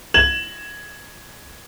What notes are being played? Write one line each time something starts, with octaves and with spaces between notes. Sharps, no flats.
G#6 E7 F#7